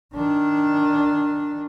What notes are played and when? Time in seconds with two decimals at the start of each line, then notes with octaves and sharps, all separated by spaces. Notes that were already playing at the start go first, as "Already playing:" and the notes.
0.15 D#3 D4